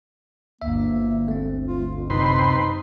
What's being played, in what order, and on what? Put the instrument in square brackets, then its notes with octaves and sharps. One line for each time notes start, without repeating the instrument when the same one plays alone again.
[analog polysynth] G1 D2 [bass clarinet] A#3 [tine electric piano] E5
[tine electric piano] A3 C4
[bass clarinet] F4
F2
[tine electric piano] F#2 [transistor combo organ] C3 B4 C6 [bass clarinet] D#4